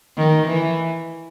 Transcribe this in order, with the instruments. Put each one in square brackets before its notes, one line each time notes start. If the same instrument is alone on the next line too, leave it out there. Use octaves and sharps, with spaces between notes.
[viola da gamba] D#3
E3